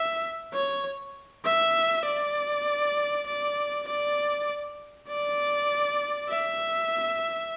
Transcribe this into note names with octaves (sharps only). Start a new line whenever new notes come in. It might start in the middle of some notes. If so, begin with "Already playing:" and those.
Already playing: E5
C#5
E5
D5
D5
D5
D5
E5